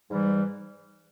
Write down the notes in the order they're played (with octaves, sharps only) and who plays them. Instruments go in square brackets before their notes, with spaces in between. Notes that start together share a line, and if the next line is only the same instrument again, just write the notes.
[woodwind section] G#2 E3 G3